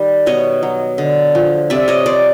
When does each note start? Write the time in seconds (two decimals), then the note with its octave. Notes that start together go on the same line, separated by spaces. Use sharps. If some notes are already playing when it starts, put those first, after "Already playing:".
Already playing: D#3 G3
0.26 B2 C#5 D#5
0.63 F#3
0.98 D3
1.35 F3
1.70 C3 D5 E5
1.88 C#5 D#5
2.06 C3 C5 D5